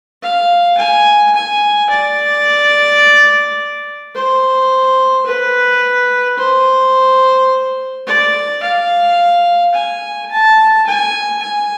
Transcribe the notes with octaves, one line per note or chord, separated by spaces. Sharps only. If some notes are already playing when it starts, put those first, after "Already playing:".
F5
G#5
G#5
D5
C5
B4
C5
D5
F5
G#5
A5
G#5
G#5